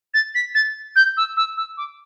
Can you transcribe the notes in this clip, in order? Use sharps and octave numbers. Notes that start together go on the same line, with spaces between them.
A6
B6
A6
G6
E6
E6
E6
D6